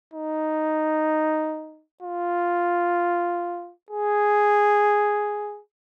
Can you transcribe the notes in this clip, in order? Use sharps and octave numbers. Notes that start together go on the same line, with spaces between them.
D#4
F4
G#4